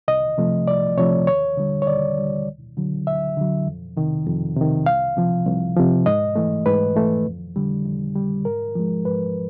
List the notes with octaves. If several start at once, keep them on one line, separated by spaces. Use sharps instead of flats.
C2 D#5
C3 F3 A3
C2 D5
C3 F3 A3 C#5
D#2 C#5
D3 G3
C#5
D#2 D5
D3 G3
D2
D3 F#3
D2 E5
D3 F#3
F2
C3 D#3
F2
C3 D#3
C2 F5
C3 F3
C2
C3 F3
G#2 D#5
E3 A3
G#2 B4
E3 A3
F2
D3 G3
F2
D3 G3
G#2 A#4
F3 G#3
G#2 B4